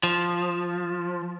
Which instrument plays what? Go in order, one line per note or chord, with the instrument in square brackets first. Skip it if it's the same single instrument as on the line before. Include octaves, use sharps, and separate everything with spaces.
[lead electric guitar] F3